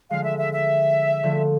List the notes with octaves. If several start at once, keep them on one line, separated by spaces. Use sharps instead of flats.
D3 F3 G#3 F5
E5
E5
E5
D3 F3 A3